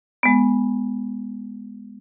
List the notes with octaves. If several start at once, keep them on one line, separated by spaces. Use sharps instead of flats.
G#3 B3